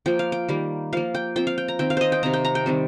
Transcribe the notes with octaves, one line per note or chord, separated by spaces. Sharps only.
F3 A#3 G5
F5
G5
D#3 G3 A#3
F3 A#3 F5
G5
F3 C4 G5
F5
G5
A#5
D#3 C4 G5
F5
C5 D#5
G5
C3 D#3 C4 A#5
G5
A#5
G5
D#3 G3 C4